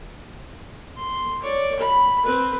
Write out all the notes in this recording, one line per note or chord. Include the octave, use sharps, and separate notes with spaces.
C6
C#5 D5
B5
C4 B4